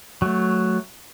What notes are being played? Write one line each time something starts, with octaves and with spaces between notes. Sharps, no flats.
F#3 A3